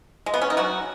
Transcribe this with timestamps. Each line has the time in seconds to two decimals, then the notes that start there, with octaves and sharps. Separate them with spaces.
0.26 G#3
0.34 B3
0.41 C#4
0.50 D#4
0.57 F#3 F#4